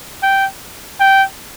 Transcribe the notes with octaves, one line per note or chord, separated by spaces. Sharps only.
G5
G5